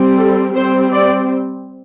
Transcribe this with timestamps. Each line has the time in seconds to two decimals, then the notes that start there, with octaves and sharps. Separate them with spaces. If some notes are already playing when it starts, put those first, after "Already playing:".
Already playing: G3 C4
0.16 A4
0.54 G3 C4 C5
0.92 D5